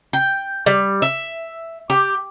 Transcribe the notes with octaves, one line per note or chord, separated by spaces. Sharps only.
G5
G3
E5
G4